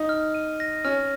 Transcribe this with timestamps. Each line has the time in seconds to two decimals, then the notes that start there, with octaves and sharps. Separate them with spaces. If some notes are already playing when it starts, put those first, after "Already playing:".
Already playing: D#4
0.09 F6
0.34 D#7
0.60 A#6
0.84 C#4 F6